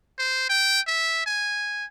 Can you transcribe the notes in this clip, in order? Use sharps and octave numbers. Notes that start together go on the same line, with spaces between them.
C5
G5
E5
G#5